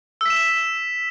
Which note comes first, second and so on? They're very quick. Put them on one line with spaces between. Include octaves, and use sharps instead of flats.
E6 B6 E7